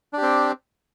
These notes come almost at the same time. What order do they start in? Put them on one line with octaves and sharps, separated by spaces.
D4 G4 C4